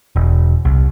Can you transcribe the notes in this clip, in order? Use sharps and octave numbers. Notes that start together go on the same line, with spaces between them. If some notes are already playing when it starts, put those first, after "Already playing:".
E1
C2